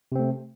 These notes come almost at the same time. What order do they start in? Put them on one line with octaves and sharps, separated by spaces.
C3 C4 A3